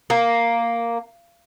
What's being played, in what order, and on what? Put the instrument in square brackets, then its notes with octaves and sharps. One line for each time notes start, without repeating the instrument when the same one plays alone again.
[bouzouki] A#3